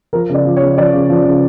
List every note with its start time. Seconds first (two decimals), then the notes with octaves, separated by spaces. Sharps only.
0.13 F3 A#4
0.29 C#3 D5
0.45 F3
0.56 C#5
0.62 C#3
0.78 F3 D5
0.93 C#3
1.09 F3
1.25 C#3